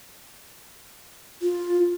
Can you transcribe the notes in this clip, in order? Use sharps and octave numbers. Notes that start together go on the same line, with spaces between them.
F4